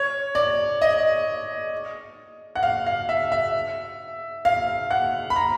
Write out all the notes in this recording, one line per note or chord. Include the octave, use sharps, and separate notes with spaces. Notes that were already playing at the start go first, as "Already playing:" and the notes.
Already playing: C#5
D5
D#5
F#5
F5
F5
E5
E5
F5
F#5
B5
A#5